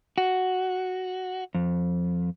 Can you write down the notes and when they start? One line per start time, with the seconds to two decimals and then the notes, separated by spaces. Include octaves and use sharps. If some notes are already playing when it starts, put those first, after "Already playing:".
0.18 F#4
1.55 F2